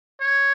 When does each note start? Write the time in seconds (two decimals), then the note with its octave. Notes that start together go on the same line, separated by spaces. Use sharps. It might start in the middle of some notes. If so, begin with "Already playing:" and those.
0.21 C#5